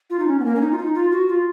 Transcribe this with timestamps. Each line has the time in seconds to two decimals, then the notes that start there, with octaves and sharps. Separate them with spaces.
0.10 F4
0.19 D#4
0.28 C#4
0.40 B3
0.45 A#3
0.56 C#4
0.61 D#4
0.72 F4
0.78 D#4
0.95 F4
1.12 F#4
1.28 F4